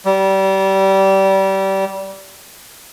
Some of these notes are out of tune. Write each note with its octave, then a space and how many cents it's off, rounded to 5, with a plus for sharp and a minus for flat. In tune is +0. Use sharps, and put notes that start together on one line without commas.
G3 -25